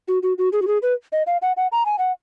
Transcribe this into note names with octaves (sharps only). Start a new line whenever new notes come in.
F#4
F#4
F#4
G#4
F#4
G#4
B4
D#5
F5
F#5
F#5
A#5
G#5
F#5